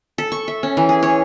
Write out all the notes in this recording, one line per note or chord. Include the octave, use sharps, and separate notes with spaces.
A4
C#6
E5
C#4
E3
G#4
C#5